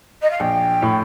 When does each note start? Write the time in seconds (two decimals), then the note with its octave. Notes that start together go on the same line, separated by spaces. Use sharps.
0.21 D#5
0.30 F5
0.40 A#1 G5
0.82 A2